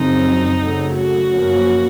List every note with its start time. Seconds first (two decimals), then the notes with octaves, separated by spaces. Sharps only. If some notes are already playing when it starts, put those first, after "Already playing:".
Already playing: F#2 C#3 F3 C4 D#4
0.60 C#3 F#3 A3
0.96 F#4
1.31 F#2 F3 A#3 C#4